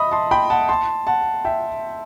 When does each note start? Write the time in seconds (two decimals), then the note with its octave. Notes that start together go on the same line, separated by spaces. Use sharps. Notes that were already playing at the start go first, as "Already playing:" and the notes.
Already playing: D#5 E5 B5 D#6
0.12 A5 C6
0.31 G5 B5
0.50 F#5 A5
0.69 A5 C6
1.07 F#5 A5
1.45 E5 G5